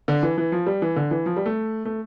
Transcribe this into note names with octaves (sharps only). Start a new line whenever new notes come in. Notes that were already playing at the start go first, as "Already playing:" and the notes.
D3
E3
E3
F3
G3
E3
D3
E3
F3
G3
A3
A3